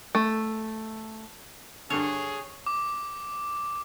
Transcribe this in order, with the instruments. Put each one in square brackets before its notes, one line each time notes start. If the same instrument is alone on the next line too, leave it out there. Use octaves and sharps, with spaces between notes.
[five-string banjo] A3
[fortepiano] G2 D3 [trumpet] G#4 [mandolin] C#5
[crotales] D6